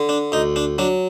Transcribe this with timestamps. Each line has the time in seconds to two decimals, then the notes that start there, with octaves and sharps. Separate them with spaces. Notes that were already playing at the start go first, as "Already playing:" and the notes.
Already playing: D3
0.09 D4
0.32 D2 D#4
0.56 D4
0.78 F#3 D4